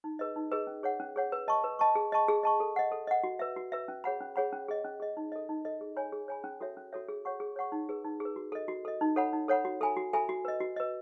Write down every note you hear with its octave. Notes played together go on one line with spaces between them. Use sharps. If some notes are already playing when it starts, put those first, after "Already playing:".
D#4
G#4 B4 D#5
D#4
G#4 B4 D#5
C#4
G#4 C#5 F#5
C#4
G#4 C#5 F#5
B4
D#5 A5 C#6
B4
D#5 A5 C#6
G#4
D#5 A5 C#6
G#4
D#5 A5 C#6
A4
D#5 F#5
A4
D#5 F#5
F#4
B4 E5
F#4
B4 E5
C#4
G#4 C#5 F#5 B5
C#4
G#4 C#5 F#5 B5
C#4
G#4 D#5
C#4
G#4 D#5
D#4
A4 D#5
D#4
A4 D#5
G#4
C#5 G#5 B5
G#4
C#5 G#5 B5
C#4
F#4 A4 C#5 E5
C#4
F#4 A4 C#5 E5
G#4
C#5 F#5 C#6
G#4
C#5 F#5 C#6
D#4
G#4 B4
D#4
G#4 B4
F#4
A4 D#5
F#4
A4 D#5
D#4
A4 C#5 F#5 B5
D#4
A4 C#5 F#5 B5
F#4
A4 E5 G#5 B5
F#4
A4 E5 G#5 B5
F#4
B4 D#5
F#4
B4 D#5